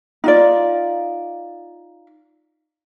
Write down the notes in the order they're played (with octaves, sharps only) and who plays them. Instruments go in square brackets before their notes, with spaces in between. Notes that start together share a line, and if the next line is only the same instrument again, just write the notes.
[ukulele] D#4 F4 D5